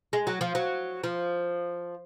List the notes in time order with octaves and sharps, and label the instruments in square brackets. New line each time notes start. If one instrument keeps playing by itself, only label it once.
[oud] G#3
F#3
F3
F#3
F3